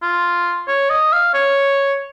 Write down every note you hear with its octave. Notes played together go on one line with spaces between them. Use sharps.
F4
C#5
D#5
F5
C#5